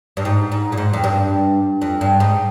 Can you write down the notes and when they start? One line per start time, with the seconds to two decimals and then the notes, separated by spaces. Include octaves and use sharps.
0.17 G2
0.25 G#2
0.52 G#2
0.72 A#2
0.77 G#2
0.93 F2
1.04 G2
1.82 F2
2.01 G2
2.20 G#2